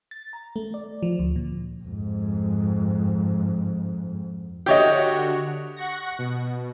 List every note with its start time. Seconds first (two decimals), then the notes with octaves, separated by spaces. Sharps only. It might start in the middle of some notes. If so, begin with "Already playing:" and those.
0.11 A6
0.33 A#5
0.56 A3
0.74 D5
1.03 F3
1.19 D2
1.36 A#2
1.84 F2 G#2
4.66 D3 F#4 G4 C#5 D#5
5.76 F#5 C#6 A#6
6.19 B2